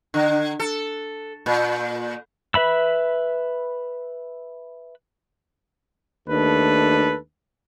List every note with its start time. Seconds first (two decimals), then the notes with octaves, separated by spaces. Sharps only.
0.14 D3
0.59 A4
1.46 A#2
2.54 B4 E5 B5 E6
6.27 D#2 A3 D4 A4 B4